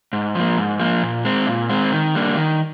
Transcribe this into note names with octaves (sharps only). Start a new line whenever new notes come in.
G#2
F3 A#3
G#2
F3 A#3
A#2
G#3 C4
A#2
G#3 C4
D#3
G3 A#3 D4
D#3